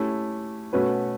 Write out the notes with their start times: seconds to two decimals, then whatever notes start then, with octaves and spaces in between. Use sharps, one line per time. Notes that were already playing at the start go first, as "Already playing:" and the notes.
Already playing: A3 C#4 E4 G4
0.73 B2 A3 C#4 F#4 B4